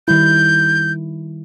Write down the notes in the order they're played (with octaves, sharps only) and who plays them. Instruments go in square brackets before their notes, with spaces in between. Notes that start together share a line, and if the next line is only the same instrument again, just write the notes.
[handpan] D#3 G3 E4 [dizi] G6